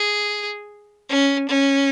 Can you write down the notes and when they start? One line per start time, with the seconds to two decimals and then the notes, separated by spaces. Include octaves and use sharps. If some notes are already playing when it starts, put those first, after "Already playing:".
Already playing: G#4
1.09 C#4
1.49 C#4